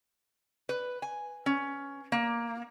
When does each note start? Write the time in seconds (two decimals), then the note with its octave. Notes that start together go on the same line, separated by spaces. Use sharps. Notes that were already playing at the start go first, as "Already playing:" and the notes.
0.69 B4
1.02 G#5
1.46 C#4
2.12 A#3